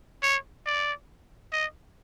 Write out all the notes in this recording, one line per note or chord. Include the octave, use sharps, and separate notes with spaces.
C#5
D5
D#5